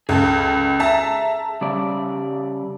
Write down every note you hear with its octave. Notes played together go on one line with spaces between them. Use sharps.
C#2 G#4 A4
E5 A5 A#5
C#3 G3 D5